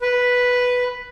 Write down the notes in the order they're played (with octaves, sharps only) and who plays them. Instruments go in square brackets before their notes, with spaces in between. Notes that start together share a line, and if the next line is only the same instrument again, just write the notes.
[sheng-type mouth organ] B4